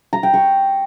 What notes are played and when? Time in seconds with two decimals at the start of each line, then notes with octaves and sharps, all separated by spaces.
0.13 A#5
0.23 G5
0.34 C#6